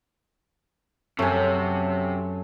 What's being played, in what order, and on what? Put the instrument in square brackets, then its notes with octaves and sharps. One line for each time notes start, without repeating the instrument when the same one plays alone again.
[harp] F#2 F#3 [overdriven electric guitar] C3 [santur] A3 G#5 [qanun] C#4